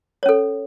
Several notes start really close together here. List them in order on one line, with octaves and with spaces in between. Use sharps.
C#5 C#4 A4